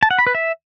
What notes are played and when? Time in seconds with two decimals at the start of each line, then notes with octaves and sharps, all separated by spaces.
0.03 A5
0.11 F#5
0.19 B5
0.27 B4
0.35 E5